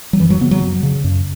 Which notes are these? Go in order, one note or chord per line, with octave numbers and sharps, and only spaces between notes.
F#3
F#2 E3
F#3
C#3 B3
F#3
F#2
C#3
F#2